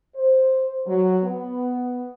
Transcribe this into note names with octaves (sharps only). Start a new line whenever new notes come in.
C5
F#3
B3